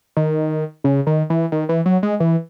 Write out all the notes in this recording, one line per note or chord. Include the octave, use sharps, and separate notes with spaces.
D#3
C#3
D#3
E3
D#3
E3
F#3
G#3
E3